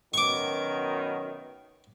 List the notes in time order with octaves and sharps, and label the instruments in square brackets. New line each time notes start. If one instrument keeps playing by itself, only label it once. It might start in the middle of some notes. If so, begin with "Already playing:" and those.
[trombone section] F#2 B2 D#3 [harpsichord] C#6 D6